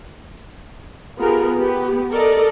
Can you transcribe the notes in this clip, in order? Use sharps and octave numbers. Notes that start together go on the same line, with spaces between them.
B3 F4 G4 G#4 A#4
B3 G4
A4 A#4 D5 D#5